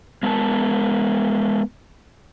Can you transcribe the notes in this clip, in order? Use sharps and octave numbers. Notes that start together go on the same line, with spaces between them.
G#3 B3 A#4 B4 A5